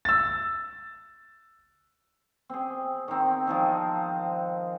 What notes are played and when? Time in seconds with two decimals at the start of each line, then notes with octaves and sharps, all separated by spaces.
0.05 E6 A6
2.49 C4 G#4
3.08 D#3 C4
3.47 D#3 F3 G#3